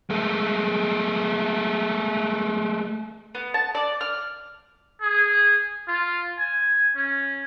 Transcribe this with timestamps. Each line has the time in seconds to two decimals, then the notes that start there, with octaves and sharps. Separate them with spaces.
0.10 G#3 A3
3.35 B3
3.54 A5
3.75 D5
4.01 F6
5.02 G#4
5.88 F4
6.39 G#5
6.96 C#4